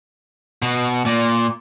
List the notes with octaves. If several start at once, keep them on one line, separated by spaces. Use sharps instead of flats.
B2
A#2